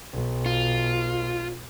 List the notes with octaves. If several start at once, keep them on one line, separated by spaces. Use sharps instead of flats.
B1
F4